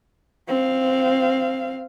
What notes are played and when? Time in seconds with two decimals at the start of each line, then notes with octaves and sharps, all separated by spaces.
0.48 C4 F5